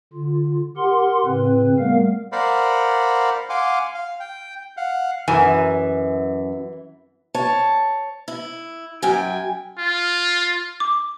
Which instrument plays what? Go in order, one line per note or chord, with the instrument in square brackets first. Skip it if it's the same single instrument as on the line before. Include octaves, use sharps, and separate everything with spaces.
[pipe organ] D3 F4
G4 A#4 F#5 C6
A2 C#3 C4 B4
G3 A3 B3 A#4 F5
[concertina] A#4 C5 D5 F5 F#5 B5
F5 F#5 G#5 C6 D6
F5
G5
F5 F#5
[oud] F#2 [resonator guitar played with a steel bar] E3 [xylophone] G#5
[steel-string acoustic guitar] C#5 A5
E4
F#2 G5 G#5
[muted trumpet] F4
[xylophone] D6